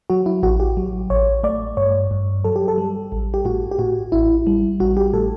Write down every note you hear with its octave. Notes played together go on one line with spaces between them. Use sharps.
F#3 F#4
E4
A1 F#4
G4
F#3
A1 C#5
A3 D5
G2 C#5
G2
F#3 A4
G4
A4
G3
A1
G4
A2 F#4
G4
A2 F#4
A1 E4
G3
A1 F#4
G4
A2 A4